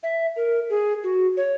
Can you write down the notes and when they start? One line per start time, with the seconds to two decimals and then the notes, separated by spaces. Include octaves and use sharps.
0.03 E5
0.36 A#4
0.70 G#4
1.04 F#4
1.37 C#5